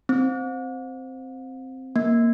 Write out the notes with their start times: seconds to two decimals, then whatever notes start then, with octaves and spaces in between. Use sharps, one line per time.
0.09 C4
1.96 A#3